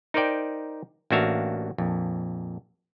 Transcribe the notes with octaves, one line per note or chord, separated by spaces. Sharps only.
D#4 A#4 C5 D5 G5
A1 A#3 D4 F#4 E5 F5
A#1 F2